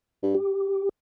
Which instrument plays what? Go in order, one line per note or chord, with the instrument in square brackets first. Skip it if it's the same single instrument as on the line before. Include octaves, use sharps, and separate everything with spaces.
[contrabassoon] G2
[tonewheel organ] G4